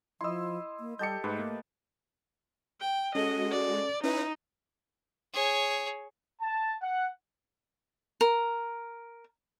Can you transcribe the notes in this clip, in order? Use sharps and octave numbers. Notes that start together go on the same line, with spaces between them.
F3 E4 D#5 C6 E6
A#3
G3 G4 A4 D#5 G6 C#7
G#2 A3 B4
A#3
G5
G#3 C#4 F#4 A4 D#5
D5
C#4 D#4 E4 B4
G#4 C#5
A5
F#5
A#4